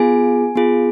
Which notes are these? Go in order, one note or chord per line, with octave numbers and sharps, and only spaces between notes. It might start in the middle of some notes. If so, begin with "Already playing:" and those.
Already playing: B3 F4 G#4 G#5
B3 F4 G#4